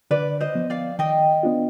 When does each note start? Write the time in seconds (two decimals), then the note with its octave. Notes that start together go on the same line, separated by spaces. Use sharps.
0.11 D3 B4 D5
0.40 C5 D#5
0.55 F3 B3
0.70 D5 F5
0.99 D#3 D#5 G5
1.43 B3 D4 F4